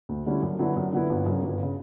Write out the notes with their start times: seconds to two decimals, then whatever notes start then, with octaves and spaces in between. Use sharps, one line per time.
0.09 D2
0.26 D3 G3 C#4 E4
0.43 F#2
0.59 D3 F#3 B3 E4
0.76 F#2
0.93 D3 F#3 B3 E4
1.09 G1
1.26 F#2 C#3
1.43 G1
1.63 C#3